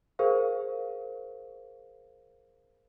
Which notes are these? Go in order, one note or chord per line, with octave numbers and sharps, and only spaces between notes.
G#4 A#4 C5 F5